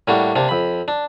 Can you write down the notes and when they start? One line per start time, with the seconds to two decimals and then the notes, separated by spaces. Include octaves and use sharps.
0.08 A2 G3 A#3 D4 F#4
0.36 C3 A#3 D4
0.49 F2 B5
0.88 D4